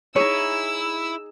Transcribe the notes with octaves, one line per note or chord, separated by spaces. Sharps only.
D#4 E4 G#4 C#5 E6